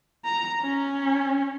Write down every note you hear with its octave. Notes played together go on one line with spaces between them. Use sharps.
A#5
C#4